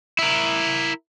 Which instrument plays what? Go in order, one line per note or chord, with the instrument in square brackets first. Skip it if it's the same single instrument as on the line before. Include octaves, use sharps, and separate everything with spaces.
[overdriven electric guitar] E4 A#4